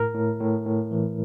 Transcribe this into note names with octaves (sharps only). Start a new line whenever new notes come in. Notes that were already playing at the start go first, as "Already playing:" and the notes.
Already playing: A2 A#4
A2
A2
A2
E3